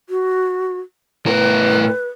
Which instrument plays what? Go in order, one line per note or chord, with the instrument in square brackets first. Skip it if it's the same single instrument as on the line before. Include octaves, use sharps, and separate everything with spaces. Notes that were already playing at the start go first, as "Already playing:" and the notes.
[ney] F#4
[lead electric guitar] A2 A#4 [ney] B4